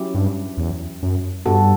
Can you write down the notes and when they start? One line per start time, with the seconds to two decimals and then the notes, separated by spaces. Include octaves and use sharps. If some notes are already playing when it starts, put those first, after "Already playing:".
Already playing: F#3 C#4 E4 G4
0.14 G2
0.57 E2
1.03 F#2
1.46 G2 G3 B3 F#4 A4